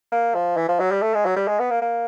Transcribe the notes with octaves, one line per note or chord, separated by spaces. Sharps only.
A#3
F3
E3
F3
F#3
G3
A3
G#3
F#3
G3
G#3
B3
A#3
A#3